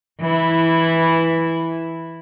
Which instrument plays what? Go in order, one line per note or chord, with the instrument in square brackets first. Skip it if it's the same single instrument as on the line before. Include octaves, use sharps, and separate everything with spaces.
[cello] E3 E4